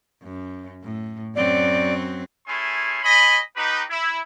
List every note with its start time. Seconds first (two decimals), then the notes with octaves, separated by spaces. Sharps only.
0.23 F#2
0.83 A2
1.36 F#2 F#3 C4 D5
2.47 A3 C#4 E4 G#4 G#5 C6
3.02 C#5 D#5 G#5 B5
3.56 D#4 G4 B4
3.90 E4